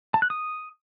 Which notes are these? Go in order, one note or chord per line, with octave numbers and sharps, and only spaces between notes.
A5
F#6
D#6